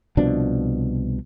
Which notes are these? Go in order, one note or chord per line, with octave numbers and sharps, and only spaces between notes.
C2 B2 F3 D4